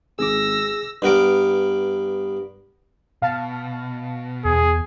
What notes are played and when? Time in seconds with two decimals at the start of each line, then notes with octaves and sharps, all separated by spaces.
0.19 G#1 G#4 D6 E6 A#6
1.02 G2 B3 A#4 D6
3.22 B2 F5 A5
4.45 E2 G#4